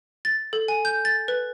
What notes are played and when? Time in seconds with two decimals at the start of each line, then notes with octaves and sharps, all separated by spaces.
0.25 A6
0.53 A4
0.68 G#5
0.85 G6
1.05 A6
1.28 B4